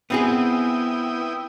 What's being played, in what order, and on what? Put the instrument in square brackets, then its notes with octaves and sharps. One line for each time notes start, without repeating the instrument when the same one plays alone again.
[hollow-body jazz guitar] B3 C4 G#4 [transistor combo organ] E4 G5 D#6